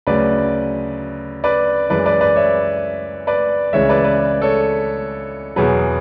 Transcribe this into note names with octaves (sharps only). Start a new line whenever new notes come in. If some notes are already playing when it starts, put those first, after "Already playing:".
D2 C#3 F#3 B4 D5
B4 D5
F#2 E3 G#3 B4 D5
B4 D5
B4 D5
C#5 E5
B4 D5
C#2 C#3 E3 G#3 C#5 E5
B4 D5
B4 D5
A4 C#5
E2 B2 F#3 G#4 B4